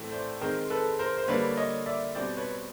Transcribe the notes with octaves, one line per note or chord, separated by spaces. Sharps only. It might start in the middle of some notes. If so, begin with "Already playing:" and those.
Already playing: A2 E3 A3 C4
C5 D5
D#3 G#3 C4 A#4 C5
A4 B4
A#4 C5
C5
D3 G3 A#3 B4 C#5
C#5 D#5
D5 E5
B2 G3 C4 C5 D5
B4 C#5